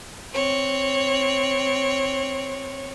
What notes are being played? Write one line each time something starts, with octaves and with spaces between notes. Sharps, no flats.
C4 C#5